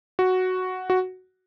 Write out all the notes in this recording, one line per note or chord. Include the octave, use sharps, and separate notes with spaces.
F#4
F#4